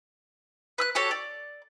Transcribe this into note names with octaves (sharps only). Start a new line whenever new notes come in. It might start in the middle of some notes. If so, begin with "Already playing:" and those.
B4 E6 F#6
F#4 G4 A4 C#5
D5